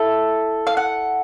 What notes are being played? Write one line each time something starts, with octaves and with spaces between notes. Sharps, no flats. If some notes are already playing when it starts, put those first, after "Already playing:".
Already playing: E4 A4
F5
F#5